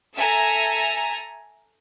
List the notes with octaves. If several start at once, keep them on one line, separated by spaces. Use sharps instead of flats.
A4 E5 G#5 A#5